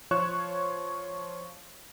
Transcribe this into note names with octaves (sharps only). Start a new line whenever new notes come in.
F3 F4 C#5 C#6 F#6 E7